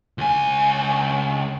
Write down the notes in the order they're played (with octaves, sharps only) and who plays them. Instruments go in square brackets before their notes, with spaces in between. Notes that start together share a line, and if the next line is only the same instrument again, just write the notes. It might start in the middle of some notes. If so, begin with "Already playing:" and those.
[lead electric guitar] C#2 G#5